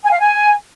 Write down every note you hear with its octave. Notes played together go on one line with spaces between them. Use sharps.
G#5
F5
G#5